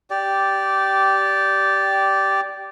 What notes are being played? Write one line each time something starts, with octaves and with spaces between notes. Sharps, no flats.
G4 D5